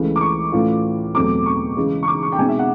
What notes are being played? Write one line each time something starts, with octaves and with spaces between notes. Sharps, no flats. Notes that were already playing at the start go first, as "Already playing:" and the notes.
Already playing: C#2 C#3 E3 A3
D6
C#6
A2 E3 A3 C#4 F4
E2 B2 F#3 A3 C4 D6
C#6
C#3 E3 G#3
C#6
D6
C#6
G5
B2 G#3 C4 D#4 G#5
E5
F#5